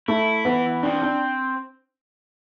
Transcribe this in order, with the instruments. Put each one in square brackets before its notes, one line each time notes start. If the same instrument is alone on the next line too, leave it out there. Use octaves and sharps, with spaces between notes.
[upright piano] A3 [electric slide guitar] E4
[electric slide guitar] E3 [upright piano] B3
[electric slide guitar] C4 [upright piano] D4
[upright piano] D4